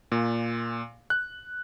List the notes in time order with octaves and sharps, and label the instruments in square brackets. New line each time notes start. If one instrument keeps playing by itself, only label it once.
[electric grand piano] A#2
F#6